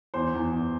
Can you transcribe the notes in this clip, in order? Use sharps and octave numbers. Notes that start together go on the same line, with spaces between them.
E2 C5
E2
E2